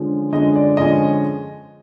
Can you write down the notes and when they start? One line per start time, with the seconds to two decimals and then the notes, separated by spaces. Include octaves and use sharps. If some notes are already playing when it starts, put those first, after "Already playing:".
Already playing: D3 F3 G#3 C#4
0.33 D3 F3 G#3 C#4 D#5
0.56 D5
0.77 D3 F3 G#3 C#4 D#5